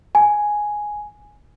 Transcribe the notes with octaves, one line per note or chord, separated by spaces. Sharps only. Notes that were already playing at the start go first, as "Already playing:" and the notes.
G#5